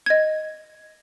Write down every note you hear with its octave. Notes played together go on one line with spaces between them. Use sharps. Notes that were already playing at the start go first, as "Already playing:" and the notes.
D#5 G#6